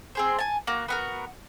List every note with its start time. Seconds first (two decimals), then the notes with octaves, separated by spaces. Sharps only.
0.15 C4 G#4 C5
0.39 G#5 A5
0.67 A#3 F#4
0.88 B3 F#4 A#4